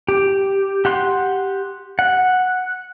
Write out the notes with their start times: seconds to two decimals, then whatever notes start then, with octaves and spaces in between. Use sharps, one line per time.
0.09 G4
0.85 G4 F#5 C6
1.99 F#5